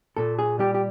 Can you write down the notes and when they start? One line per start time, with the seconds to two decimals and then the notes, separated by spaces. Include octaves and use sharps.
0.17 A#2 A4
0.39 G#4
0.59 G3 G4
0.74 G4